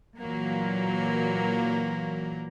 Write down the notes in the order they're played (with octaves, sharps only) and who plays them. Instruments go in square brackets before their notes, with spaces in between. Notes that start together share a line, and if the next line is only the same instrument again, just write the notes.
[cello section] A#2 E3 F#3 A#3